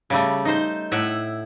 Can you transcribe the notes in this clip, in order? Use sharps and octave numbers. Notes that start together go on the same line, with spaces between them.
C#3 G3 A3
D#4 C5
A2 E5 F#5